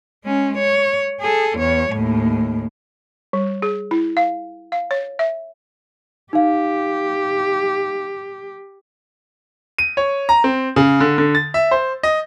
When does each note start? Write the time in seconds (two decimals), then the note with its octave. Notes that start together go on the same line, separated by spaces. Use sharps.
0.24 G#3 C#4
0.58 C#5
1.21 G#4 A4
1.58 E2 C#5
1.92 D#2 A2
3.33 G3
3.62 G#4
3.91 E4
4.17 F5
4.72 F5
4.91 C#5
5.19 E5
6.33 D#4 G4 F5
9.78 D#7
9.97 C#5
10.29 A#5
10.44 C4
10.76 C#3
11.00 D3
11.18 D3
11.35 A6
11.54 E5
11.71 C5
12.03 D#5